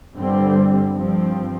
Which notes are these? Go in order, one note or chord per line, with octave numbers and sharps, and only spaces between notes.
G1 G2 D3 G3 C4
G2 F3 C4